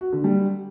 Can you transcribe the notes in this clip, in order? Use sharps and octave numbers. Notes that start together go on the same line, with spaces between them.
F#4
D3
G3